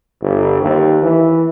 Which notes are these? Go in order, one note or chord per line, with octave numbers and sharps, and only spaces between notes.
G1
D#2
E3